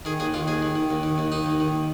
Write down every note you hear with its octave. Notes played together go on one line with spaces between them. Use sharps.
D#3 G#4
D#2 G#4
D#3 F4
D#2 G#4
D#3
D#3
D#2
D#3
D#2
D#3 D#4
D#2
D#3